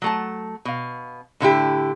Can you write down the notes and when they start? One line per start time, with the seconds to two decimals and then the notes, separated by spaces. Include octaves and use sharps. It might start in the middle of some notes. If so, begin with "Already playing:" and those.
0.02 F#3 A3 A5
0.65 B2 F5
1.40 A2 D3 E4 G4